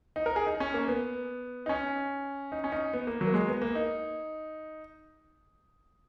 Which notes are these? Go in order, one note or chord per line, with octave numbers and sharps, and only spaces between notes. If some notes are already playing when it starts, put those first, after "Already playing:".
D#4
A#4
G#4
D#4
C#4
A#3
B3
D#4
C#4
D#4
C#4
D#4
B3
A#3
F#3
A#3
G#3
B3
A#3
D#4